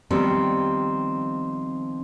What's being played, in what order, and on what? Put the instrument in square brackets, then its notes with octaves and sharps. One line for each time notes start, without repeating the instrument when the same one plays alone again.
[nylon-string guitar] D#3 F3 G3 B3 C4